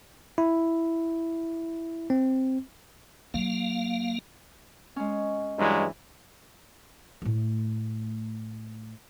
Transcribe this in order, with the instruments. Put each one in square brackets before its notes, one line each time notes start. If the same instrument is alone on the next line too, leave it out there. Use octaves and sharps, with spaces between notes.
[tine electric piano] E4
C4
[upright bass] F#3 [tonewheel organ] A#3 F5
[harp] G#3 C#4
[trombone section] G2 F#3 G#3 [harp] E3 E4
[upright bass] A2 A3